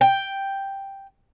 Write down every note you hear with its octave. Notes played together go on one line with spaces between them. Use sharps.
G5